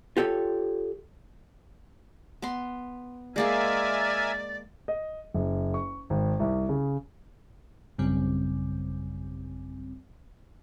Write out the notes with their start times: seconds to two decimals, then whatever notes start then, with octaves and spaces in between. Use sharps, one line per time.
0.17 F4 G4 A4 C#5
2.42 B3 C6
3.36 G#3 A#3 G#4 A#4 D5 E5 G#5
4.88 D#5
5.34 F#1
5.74 C#6
6.10 G#1
6.40 C2
6.69 C#3
7.98 A1 F#2 C#3 G3 C4